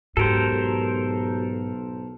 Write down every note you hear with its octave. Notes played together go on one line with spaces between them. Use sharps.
B1 G#2 F#4 G4 A4 A#4 C5